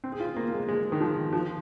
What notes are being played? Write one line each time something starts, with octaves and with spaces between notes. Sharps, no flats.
C4
G#4
F4
A#3
G#3
G#3
D#3
F3
F3